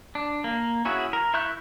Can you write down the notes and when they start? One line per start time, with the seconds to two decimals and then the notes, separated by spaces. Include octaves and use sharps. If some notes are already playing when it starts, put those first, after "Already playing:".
0.15 D4
0.44 A#3
0.85 C#4 E4 F#4 G#4
1.13 A#4
1.34 E4 E5 C#6 F#6 G6